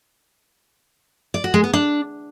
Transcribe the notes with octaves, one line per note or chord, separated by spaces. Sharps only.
D5
F#4
G#3
B3
D4